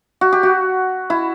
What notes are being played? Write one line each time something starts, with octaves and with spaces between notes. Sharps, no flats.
F#4
G4
F#4
E4